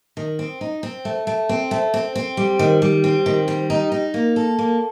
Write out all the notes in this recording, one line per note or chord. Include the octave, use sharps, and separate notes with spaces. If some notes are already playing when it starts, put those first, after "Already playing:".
D#3
C4
D#4
C4
A3
A3
C4
A3
C4
C4
G3
D#3
G3
C4
D#3
G3
D#4
D#4
A#3
A4
A#3